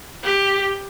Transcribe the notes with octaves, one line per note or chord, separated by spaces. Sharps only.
G4